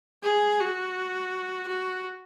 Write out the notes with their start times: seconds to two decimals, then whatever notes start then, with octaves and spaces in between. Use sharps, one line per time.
0.23 G#4
0.60 F#4
1.67 F#4